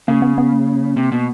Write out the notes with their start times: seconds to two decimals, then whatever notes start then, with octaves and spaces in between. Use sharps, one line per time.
0.08 C#3 A#3
0.22 B3
0.38 B3
0.53 A#3
0.97 C3
1.12 B2